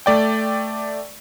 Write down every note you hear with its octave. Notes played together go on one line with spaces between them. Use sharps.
A3 D5 G5